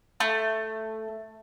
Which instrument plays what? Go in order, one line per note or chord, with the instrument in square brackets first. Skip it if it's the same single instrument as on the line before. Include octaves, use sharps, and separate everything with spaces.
[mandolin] A3